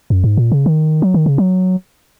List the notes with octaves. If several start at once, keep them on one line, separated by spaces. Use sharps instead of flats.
F#2
G#2
A#2
C#3
D#3
F#3
D#3
C#3
F#3